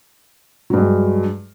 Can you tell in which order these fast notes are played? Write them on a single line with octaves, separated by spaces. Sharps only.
F#3 G2 G#3